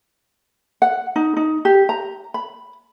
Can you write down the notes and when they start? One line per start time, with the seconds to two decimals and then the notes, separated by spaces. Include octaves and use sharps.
0.82 F#5
1.16 D#4
1.37 D#4
1.65 G4
1.89 A#5
2.34 B5